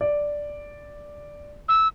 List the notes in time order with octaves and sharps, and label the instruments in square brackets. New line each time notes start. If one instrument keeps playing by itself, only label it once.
[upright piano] D5
[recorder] E6